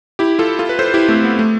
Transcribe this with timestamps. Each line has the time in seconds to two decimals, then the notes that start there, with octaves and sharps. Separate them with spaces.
0.19 E4 G4
0.39 F4 A4
0.59 F4 A4
0.69 B4
0.79 A4 C5
0.94 E4 G4
1.08 A3 C4
1.24 B3
1.39 A3